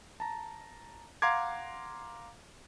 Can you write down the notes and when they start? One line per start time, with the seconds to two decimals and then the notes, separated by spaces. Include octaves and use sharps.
0.20 A5 A#5
1.22 F5 F#5 A#5 C6 D6 G#6